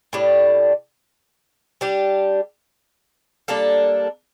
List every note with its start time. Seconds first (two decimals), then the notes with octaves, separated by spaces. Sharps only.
0.13 A2 G3 D4
1.81 G3 D4 G4
3.48 G3 A#3 D4 A4